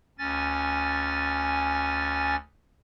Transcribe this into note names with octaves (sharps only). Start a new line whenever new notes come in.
D2 C#4 G#5 A6